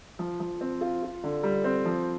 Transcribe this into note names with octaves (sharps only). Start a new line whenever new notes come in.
F3
F3
C4
F4
F4
D3
G3
C4
F3